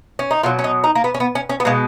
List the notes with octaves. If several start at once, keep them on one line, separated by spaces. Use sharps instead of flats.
C#4
D#4
B2 F#3 F4
C#4
D#4
D#4
A#3
B3
C#4
B3
C#4
C#4
B3
B2 G#3 A#3